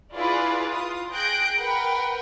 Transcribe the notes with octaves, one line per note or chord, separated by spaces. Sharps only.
E4 F4 G#4 B4 D5
F4 D#6
G#4 G5 F#6 G6 A#6 D7
A#4 B4 F#5 G5